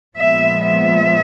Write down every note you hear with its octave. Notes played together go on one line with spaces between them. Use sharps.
A#2 F3 G#3 B3 E5
E5